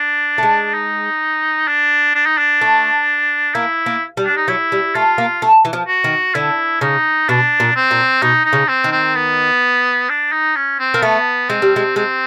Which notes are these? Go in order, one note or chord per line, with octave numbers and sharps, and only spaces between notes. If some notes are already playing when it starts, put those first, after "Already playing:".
Already playing: D4
A3
G#3
D#4
D4
D4
D#4
D4
A3
A#3 E4
A#3
G3
D4
D#4
F#3 E4
G3
A3 F4
A#3
A3
E3
F3
F#4
D#3
D3 E4
C#3 D#4
B2 D4
A#2
C4
A#2
B2 D#4
D#4
C#3
C4
D#3
C4
B3
D4
D#4
C#4
C4
A#3
A3 B3
G#3 C4
G3
G#3
G#3 C4